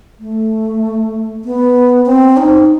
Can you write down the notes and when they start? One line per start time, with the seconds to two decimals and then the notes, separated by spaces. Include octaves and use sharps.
0.19 A3
1.45 B3
2.06 C4
2.37 D#4